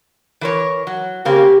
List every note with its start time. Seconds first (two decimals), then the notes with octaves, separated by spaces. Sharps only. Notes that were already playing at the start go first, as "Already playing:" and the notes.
0.41 E3 A#4 C#5
0.87 F#3
1.25 C#3 A#3 C4 G4